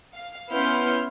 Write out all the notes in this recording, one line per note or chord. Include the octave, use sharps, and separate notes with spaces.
F5
B3 C#4 E4 C6 F6 G6